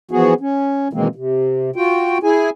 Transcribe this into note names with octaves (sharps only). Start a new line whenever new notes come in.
E3 F3 B3 F#4 G#4
C#4
B2 D#3 E3 G#3 A#3 C4
C3
F4 F#4 G5
E4 G#4 G#5